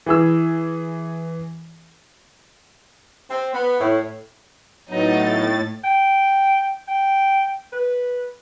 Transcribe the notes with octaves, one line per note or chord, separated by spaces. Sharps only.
E3 G#4 E6
C4
B3
A2
A2 F#3 B3 D#4 A6
G5
G5
B4